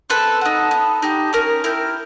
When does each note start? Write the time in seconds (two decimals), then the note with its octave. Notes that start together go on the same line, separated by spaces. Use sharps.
0.10 C4 A4 B4
0.41 D#4 F#4
0.71 B3
1.02 D#4 G4
1.33 C#4 A#4
1.64 E4 G4 A#4